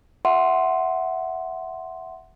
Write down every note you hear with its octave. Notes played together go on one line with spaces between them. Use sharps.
E5 F#5 C6